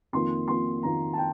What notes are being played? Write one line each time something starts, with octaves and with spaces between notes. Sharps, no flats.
F2 D#3 A#3 F4 C6
F2 D#3 A#3 F4 C6
F2 D#3 A#3 F4 A#5
A5
F4 G5